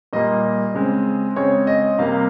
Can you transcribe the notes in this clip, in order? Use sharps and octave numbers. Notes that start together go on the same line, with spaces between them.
A#2 G3 A#3 D#5
C#3 G#3 C4
C#3 G#3 C4 C#5
D#5
C3 G3 A#3 F5